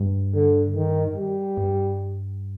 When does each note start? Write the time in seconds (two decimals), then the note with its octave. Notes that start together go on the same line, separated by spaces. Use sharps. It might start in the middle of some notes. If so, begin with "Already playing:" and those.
Already playing: G2
0.34 D3
0.75 D#3
1.16 G3
1.57 G2